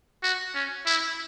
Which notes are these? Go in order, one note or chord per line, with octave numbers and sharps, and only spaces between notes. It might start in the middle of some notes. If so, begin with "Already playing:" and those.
F#4
C#4
E4